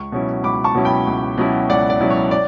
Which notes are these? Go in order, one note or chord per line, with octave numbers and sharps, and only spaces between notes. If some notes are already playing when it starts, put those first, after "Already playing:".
Already playing: C#2 C#6
B2 F#3 C#4 E4
C#2 B5 D6
A5 C#6
B2 F#3 C#4 E4
G5 B5
C#2
B2 F#3 C#4 E4
C#2 D5 F#5
D5
B2 F#3 C#4 E4
C#5
D5